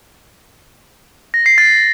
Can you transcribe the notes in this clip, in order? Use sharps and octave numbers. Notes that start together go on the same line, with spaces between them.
A#6
C7
A6